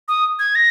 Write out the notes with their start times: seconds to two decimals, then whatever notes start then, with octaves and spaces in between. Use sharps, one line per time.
0.08 D#6
0.39 G#6
0.55 A#6